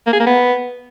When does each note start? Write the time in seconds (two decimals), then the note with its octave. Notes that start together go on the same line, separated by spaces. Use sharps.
0.07 A#3
0.13 G#4
0.20 A#3
0.26 B3